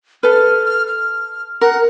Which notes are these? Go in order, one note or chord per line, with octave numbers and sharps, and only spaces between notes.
A4 B4 F6
F6
F6
A#4 F#5